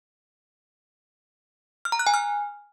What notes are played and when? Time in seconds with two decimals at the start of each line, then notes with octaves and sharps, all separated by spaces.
1.85 F6
1.92 A#5
1.99 F#6
2.07 G#5
2.14 F6